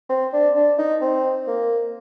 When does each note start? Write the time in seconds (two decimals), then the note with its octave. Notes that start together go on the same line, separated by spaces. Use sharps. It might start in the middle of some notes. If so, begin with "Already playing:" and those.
0.09 C4
0.33 D4
0.55 D4
0.78 D#4
1.01 C4
1.47 A#3